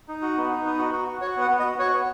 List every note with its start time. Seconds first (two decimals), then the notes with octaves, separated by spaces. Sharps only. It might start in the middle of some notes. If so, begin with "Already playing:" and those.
0.08 D#4
0.22 F#4
0.37 B3
0.51 D#4
0.65 B3
0.78 F#4
0.93 F#4
1.08 F#4
1.21 F#4 C#5
1.36 B3
1.41 F#5
1.50 B3
1.59 D#5
1.64 F#4
1.79 F#4 C#5
1.93 B3